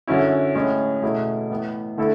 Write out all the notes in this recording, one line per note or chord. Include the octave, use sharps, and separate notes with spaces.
F#2 D3 F#3 C#4 E4
A2 G#3 C#4
E2 B2 A3 E4 G#4
A2 E3 B3
D3 A3 E4 A4